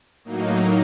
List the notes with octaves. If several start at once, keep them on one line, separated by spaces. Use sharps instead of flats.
A2 F#3 A#3 D#4